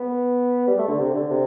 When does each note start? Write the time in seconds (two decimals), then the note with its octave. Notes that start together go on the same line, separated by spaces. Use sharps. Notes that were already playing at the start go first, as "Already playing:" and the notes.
Already playing: B3
0.67 G3
0.78 A3
0.88 D3
0.99 C3
1.14 D3
1.30 C3